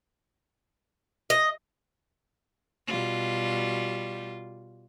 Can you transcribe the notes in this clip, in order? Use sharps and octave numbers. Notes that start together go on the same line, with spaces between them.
D#5
B2 G3 F4